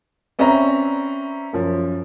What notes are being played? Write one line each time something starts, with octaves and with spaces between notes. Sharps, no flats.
C4 C#4 B4 D5 E5 A#5
F#2 F3